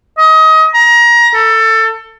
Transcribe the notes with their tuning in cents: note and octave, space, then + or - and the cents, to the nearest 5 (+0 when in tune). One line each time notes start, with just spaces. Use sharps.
D#5 +25
A#5 +25
A4 +20